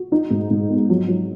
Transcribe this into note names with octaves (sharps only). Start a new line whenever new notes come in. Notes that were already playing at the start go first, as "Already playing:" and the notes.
Already playing: F#4
D#4
G#2
G#2
B3
F#3
F#3